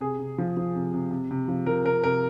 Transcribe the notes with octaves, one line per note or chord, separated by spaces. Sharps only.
C3 G#4
C3
F3
F3
C3
C3
C3
C3
F3
F3 A#4
C3 A#4
C3 A#4